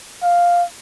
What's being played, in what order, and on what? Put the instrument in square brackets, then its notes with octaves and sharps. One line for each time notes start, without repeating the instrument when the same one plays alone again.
[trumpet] F5